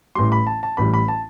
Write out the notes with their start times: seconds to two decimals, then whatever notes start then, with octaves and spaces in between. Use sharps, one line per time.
0.15 A1 A2 E3 G3 C6
0.32 B5
0.47 A5
0.63 A5
0.77 A1 A2 E3 G3 B5
0.94 B5
1.08 A5